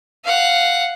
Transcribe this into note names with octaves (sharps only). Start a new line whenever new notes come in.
F5 F#5